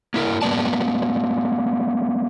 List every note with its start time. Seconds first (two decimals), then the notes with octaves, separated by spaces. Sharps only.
0.14 A#3 E4 A#4
0.42 G3 A#3 B3 D5 A5